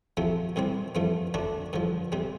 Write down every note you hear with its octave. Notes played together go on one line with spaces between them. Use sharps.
C3 F3 A3 C4
C2 C3 G3 C4
G2 F3 A3 C4
D2 D3 A3 D4
G2 D3 F3
C3 G3 C4